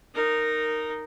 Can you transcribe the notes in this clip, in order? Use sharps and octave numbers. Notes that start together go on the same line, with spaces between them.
D#4 A#4